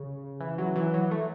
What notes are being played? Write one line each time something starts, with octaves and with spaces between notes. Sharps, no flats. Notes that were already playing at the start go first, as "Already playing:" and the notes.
Already playing: C#3
E3
F#3
E3
F#3
A3